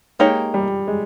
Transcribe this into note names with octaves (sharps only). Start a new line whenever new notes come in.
G#3 A#3 D#4 G4 C#5
G3
G#3